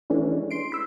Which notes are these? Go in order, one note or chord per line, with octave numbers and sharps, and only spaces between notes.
E3 A3 C#4 D4
G#3
C6 D7
B5 E6